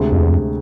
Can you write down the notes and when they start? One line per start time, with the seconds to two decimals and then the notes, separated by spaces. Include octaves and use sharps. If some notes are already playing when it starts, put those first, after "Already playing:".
Already playing: D2 C3 G#3
0.12 F2
0.20 E2
0.30 F2